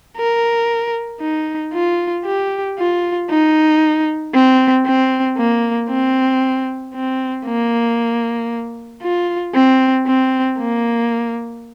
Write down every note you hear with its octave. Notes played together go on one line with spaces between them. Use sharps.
A#4
D#4
F4
G4
F4
D#4
C4
C4
A#3
C4
C4
A#3
F4
C4
C4
A#3